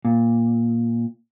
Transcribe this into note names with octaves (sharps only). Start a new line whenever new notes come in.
A#2